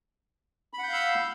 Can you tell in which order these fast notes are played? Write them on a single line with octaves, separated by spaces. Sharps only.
B5 F#5 G6 F5 E6